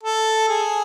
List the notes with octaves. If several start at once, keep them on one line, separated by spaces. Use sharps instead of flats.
A4
G#4